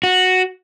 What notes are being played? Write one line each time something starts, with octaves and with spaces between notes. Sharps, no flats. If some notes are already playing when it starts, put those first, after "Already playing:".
F#4